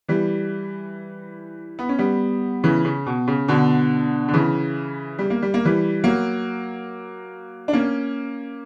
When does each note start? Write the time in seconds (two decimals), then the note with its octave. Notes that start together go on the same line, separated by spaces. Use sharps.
0.08 E3 G3
1.79 B3
1.89 C#4
1.99 G3 B3
2.64 C#3 E3
2.85 C#3
3.06 B2
3.28 C#3
3.48 B2 D3
4.28 D3
4.33 C#3 E3
5.19 G3
5.30 A#3
5.42 G3
5.54 A#3
5.65 E3 G3
6.04 F#3 A#3
7.68 D4
7.73 A#3 C#4